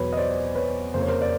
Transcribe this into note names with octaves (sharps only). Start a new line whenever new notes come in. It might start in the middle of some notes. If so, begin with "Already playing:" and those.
Already playing: E2 B2 F#3 B4 C#5
D#5
C5 D5
B4 C#5
F2 C#3 F3 A#3 C5
C#5
A#4 C5
D5